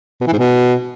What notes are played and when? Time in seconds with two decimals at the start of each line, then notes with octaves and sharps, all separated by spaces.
0.21 B2
0.27 E3
0.33 G#2
0.39 B2